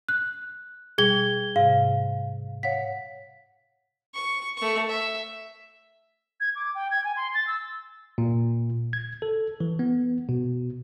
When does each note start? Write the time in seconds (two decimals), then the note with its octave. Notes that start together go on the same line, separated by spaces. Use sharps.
0.09 F#6
0.98 B2 G3 G#4 G#6 G7
1.56 G#2 C3 F5
2.63 C#5 F5 F#5 B6
4.14 C#6
4.57 A3 C#6
4.89 E5
6.40 G#6
6.56 D6
6.75 G5
6.91 G#6
7.04 G#5
7.16 C6
7.34 A6
7.47 E6
8.18 A#2
8.93 G#6
9.22 A4
9.60 E3
9.79 B3
10.29 B2